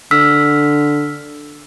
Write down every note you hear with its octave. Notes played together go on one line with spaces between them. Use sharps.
D3 E6 F6 B6